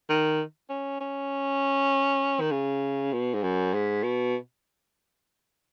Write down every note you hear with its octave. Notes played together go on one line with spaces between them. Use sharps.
D#3
C#4
C#4
D#3
C#3
B2
G#2
F#2
G#2
B2